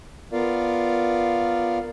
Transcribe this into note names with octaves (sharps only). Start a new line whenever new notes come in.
B3 F4 A#4 D5 F5